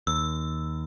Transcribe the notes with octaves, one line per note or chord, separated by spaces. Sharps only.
D#2 E6